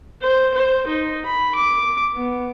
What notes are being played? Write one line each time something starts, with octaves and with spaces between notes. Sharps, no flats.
C5
C5
D#4
B5
D6
B3